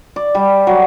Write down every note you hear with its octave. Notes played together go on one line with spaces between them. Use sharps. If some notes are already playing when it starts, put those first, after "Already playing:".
D5
G3
F#3